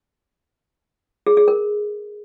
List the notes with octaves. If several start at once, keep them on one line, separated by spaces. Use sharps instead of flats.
G#4
G#4
A#4